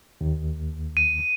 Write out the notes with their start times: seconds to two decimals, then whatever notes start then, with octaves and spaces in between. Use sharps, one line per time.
0.21 D#2
0.97 D#7